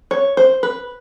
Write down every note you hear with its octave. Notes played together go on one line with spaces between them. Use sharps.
C#5
C5
B4